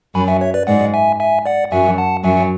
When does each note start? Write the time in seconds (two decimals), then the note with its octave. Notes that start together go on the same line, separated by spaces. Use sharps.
0.15 F#2 F#3 G#5 B5
0.28 E5 G#5
0.41 C#5 E5
0.54 B4 D5
0.67 G#2 G#3 D5 F#5
0.94 E5 G#5
1.20 E5 G#5
1.46 D5 F#5
1.71 F#2 F#3 E5 G#5
1.98 F#5 A5
2.24 F#2 F#3 E5 G#5